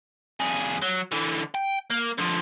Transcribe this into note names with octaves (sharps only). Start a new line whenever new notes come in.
F2 G#4
F#3
D3 E3
G5
A#3
D3 F3